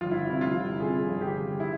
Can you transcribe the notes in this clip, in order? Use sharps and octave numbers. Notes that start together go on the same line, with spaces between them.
G1 F4
E4
C3 E4
F4
G1
C3 G#4
G1
G4
G1
E4